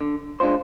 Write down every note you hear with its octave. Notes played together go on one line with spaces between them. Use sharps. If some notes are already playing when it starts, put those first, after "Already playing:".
D3
G#3 D4 F4 C5